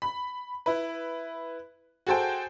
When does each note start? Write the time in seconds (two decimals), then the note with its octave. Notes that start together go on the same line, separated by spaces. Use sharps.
0.02 B5
0.66 E4 B4
2.07 F#4 G#4 A4 C5 G5